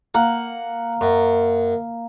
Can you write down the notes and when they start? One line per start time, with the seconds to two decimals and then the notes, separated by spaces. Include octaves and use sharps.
0.14 A#3 F#5
1.01 F#2